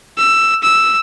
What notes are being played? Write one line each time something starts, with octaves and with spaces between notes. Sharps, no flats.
E6
E6